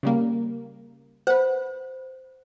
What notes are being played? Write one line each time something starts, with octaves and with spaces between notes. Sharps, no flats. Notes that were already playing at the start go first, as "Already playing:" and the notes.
C#3 G3 A#3
B4 C5 F#5